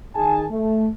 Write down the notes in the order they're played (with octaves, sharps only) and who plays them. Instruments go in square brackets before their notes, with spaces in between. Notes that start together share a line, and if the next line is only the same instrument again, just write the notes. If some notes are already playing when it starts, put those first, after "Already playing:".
[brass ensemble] D#3 D#4 G#4 G#5 A5
A3